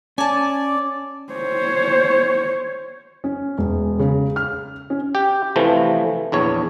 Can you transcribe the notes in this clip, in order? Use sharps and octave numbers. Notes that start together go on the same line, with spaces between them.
C#4 D5 G#5 A5
C5 C#5
C#4
E1
C#3
F6
C#4
G4
C3 E3 F3 A3
A#1 E2 C#5